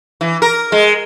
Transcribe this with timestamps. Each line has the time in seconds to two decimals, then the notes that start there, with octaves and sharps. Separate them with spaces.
0.21 E3
0.42 A#4
0.72 G#3